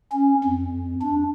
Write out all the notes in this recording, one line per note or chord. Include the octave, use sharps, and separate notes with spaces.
C#4
F2
D4